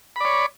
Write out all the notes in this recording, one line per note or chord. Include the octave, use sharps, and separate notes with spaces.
C#5 D5 B5